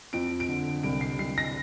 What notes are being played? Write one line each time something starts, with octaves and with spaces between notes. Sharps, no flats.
F2 D7
D7
D3
C2 D7
C7
C2 C7
A#6